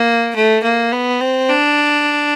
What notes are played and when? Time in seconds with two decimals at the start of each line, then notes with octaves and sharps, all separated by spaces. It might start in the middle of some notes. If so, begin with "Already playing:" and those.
Already playing: A#3
0.35 A3
0.63 A#3
0.92 B3
1.20 C4
1.49 D4